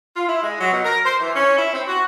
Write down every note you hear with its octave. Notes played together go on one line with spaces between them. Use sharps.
F4
E4
G#3
F#3
B2
A#4
C5
E3
C#4
E4
C4
F#4